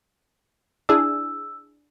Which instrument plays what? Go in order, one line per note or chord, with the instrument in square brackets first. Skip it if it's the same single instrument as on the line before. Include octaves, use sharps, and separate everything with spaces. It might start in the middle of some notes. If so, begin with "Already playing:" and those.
[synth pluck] D4 E4 G#4 [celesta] E6